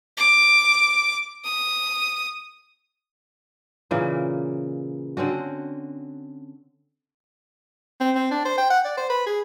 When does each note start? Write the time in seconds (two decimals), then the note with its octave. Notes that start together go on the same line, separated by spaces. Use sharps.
0.18 D6
1.45 D#6
3.91 A#2 C#3 E3 A#3
5.17 D3 C4 C#4 F#4
8.01 C4
8.15 C4
8.31 D4
8.45 C5
8.58 G5
8.70 F#5
8.85 D5
8.97 C5
9.09 B4
9.26 G#4